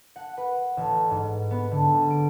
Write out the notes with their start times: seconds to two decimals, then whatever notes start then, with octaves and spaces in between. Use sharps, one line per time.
0.16 F#5
0.37 B4
0.77 A1
1.11 G#2
1.51 B3
1.71 D3
1.94 G3
2.11 D7